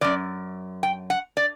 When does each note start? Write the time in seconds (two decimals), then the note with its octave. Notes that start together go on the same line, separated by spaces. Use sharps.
0.01 E3 D5
0.04 F#2
0.83 G5
1.10 F#5
1.37 D5